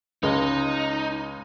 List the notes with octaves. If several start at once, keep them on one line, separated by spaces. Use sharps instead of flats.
C#2 G#3 D#4